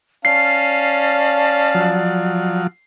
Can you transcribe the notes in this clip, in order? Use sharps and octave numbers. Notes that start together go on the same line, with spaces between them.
C#4 D5 F5 A5 C7
F3 F#3